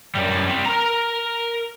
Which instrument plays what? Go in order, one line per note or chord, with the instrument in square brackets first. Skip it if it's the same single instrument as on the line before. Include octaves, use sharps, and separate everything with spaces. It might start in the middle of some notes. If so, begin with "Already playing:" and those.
[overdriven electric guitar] F#2 G3
C3 G3
A#4 A#5